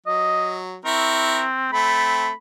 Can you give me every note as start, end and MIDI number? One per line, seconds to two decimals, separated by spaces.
0.06 0.80 54
0.06 0.59 75
0.85 1.69 60
0.85 1.44 64
0.85 1.44 70
0.85 1.44 85
1.72 2.30 57
1.72 2.30 60
1.72 2.33 83